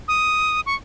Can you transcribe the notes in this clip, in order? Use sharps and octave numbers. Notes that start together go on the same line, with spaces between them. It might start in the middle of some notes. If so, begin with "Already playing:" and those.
D#6
C#6